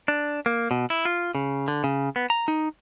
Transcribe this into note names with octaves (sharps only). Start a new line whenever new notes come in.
D4
A#3
B2
E4
F4
C#3
D3
C#3
B3
A#5
D#4